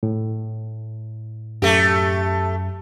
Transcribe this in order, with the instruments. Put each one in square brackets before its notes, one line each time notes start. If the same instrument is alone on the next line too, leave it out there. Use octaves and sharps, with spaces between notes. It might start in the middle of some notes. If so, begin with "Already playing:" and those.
[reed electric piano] A2
[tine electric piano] F#2 [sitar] A3 G4